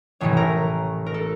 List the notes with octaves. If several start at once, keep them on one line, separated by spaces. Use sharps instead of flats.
A1 A2 E3 C#5
A#4
A#4
A4